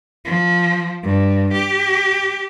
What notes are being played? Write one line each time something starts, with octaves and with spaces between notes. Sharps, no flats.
F3
G2
G4